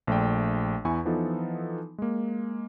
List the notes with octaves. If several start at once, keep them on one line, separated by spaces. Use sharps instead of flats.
A#1 A3 D5 G5
E2 E4 G#5 C#6
E3 F3 B3 D#4 F4 A4
G#3 A#3